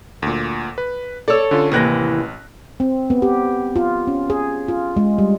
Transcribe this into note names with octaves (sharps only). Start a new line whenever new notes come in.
D2 A#2
B4
A4 C#5 D5 E6
D3 C#4 F4
A1 D#2 C3 E3 F#6 A#6
C4
B3
G4
F4
C#4
G#4
F4
G#3
G3